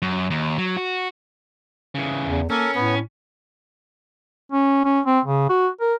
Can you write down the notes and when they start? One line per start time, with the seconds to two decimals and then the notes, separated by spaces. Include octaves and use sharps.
0.02 F#2
0.30 D#2
0.58 F#3
0.77 F#4
1.95 C#3 E3
2.25 E2
2.50 A#3 C#4 A4 A#4
2.75 A2 B3
4.52 C#4
4.85 C#4
5.06 C4
5.25 C#3
5.49 F#4
5.81 A#4